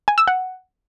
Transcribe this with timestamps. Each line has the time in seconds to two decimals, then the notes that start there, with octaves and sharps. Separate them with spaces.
0.08 G#5
0.18 E6
0.27 F#5